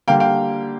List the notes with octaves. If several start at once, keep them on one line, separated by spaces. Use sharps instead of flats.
D3 G3 A#3 F5 G5
F5 G5